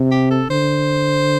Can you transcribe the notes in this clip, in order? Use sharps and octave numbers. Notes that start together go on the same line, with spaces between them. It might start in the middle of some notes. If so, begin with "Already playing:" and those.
Already playing: C3
G4
A4
D3 C5